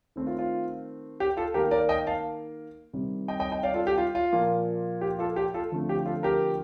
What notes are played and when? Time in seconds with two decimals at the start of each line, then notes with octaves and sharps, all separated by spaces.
0.16 D#3 A3 C4
0.27 F4
0.39 F4
1.20 G4
1.37 F4 A4
1.54 D#3 G4 A#4
1.58 A#3
1.71 A#4 D5
1.89 D#5 G5
2.07 F5 A5
2.93 C3 D#3 G3
3.28 D#5 G5
3.40 D#5 G5
3.51 D#5 G5
3.63 D5 F5
3.74 F4 A4
3.87 G4
3.98 F4
4.15 F4
4.32 A#2 F3 A#3
5.01 G4
5.19 F4 A4
5.36 G4
5.54 F4 A4
5.72 D3 F3 A3 C4
5.89 G4
6.06 F4 A4
6.23 G4 A#4